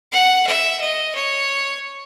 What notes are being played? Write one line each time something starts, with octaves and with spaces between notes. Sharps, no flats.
F#5
E5
D#5
C#5